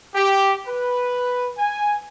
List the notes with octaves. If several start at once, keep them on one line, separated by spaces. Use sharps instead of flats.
G4
B4
G#5